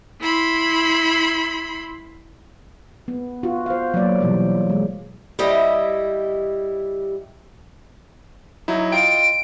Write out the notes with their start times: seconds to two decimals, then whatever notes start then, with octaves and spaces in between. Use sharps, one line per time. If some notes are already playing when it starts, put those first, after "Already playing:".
0.20 E4 B5 C6
3.08 B3
3.43 B3 F4 F#4
3.66 C5 F5
3.94 F#3 A#3 D5
4.21 B2 E3 F#3 G3
4.70 G#3
5.39 G3 E4 G4 D#5
8.68 F#3 D#4 E4
8.92 F4 D#5 G5 D7